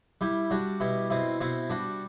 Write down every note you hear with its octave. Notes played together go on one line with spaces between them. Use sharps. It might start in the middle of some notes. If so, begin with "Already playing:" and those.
G3 E4 G4
G3 D4 F#4
B2 E4 G4
B2 C4 E4
B2 C4 E4
G3 D4 F#4